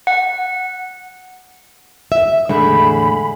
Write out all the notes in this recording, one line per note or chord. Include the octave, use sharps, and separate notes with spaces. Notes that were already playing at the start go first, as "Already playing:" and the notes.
F#5
E5
E2 A2 D3 G#3 B5